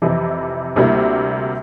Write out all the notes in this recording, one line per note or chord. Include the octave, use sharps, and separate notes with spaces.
F2 C3 E3
D2 C3 G3 A#3 E4